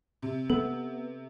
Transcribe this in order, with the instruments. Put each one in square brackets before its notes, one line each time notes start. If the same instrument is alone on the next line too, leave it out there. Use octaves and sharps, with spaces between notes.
[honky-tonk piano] C3
[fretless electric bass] B3 [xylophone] A4